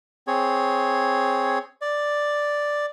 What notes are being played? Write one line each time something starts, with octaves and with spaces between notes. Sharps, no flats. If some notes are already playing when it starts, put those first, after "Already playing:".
C4 G#4 C#5
D5